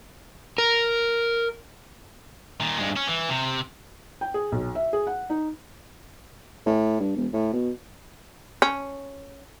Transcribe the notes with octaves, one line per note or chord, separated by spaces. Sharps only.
A#4
A#2 D#3
G2 G#3
C#4
E3
C3
G5
G#4
B1
E5
G#4
F#5
D#4
A2
G2
E1
A2
B2
C#4